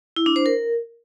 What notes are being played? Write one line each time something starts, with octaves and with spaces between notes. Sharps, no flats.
E4
D4
C5
A#4